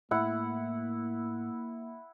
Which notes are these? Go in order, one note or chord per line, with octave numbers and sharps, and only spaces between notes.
A2 A#3 E4 F#5